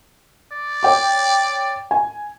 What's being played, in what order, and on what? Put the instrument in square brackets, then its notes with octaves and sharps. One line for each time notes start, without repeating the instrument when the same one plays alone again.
[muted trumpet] D5
[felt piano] C#5 G5 D6
G#5